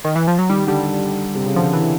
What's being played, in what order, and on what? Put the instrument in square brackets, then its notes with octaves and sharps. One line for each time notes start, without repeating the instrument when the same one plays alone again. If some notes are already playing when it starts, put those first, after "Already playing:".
[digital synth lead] D#3
E3
F3
F#3
[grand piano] D#3 [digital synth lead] G3
[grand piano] D3 [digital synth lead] G3
[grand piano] C3
C#3
[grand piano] D3 [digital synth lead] F3
[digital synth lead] E3